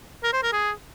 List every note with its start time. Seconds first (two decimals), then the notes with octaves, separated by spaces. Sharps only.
0.23 A#4
0.33 C5
0.43 A#4
0.52 G#4